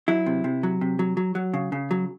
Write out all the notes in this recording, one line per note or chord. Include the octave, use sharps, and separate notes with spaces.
F#3 E4
C3
C3
F#3
C3
F#3
F#3
F#3
C#3
C#3
F#3